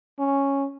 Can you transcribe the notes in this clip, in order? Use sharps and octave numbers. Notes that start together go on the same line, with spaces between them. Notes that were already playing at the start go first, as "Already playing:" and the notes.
C#4